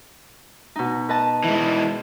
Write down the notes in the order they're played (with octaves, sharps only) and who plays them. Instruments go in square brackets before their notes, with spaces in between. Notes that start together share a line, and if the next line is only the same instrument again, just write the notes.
[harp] B2 D#4
B4 D#5 A5
[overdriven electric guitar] E3 G#3